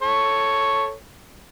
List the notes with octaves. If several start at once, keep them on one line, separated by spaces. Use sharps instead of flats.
A4 C#5